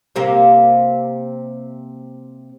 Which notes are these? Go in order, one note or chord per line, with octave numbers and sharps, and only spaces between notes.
C3 A#3 C4